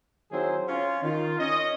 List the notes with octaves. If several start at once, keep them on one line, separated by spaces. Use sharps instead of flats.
D#3 F#3 C4 E4 G#4 C5
C#4 F4
D#3 F4
C#4 D#5